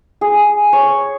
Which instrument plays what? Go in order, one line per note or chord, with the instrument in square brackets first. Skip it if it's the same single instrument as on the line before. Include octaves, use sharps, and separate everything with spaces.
[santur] G#4
C#5